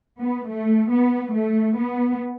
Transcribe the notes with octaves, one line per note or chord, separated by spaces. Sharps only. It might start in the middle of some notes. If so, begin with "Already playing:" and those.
B3
A3
B3
A3
B3